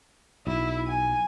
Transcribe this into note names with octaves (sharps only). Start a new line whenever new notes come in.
B1 E4
G#5